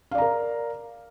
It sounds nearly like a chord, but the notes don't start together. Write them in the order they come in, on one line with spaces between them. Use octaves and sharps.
F5 D5 A#5 A#4